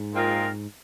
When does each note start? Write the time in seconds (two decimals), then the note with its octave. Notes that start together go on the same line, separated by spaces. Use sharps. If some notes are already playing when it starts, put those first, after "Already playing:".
Already playing: G#2
0.13 A#2 G#3 C4 F4 A#4